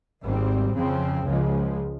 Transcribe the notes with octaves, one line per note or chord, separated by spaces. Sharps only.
G#1 G#2 G3 C4
F2 C#3 F3 C4
C#2 C#3 F3 G#3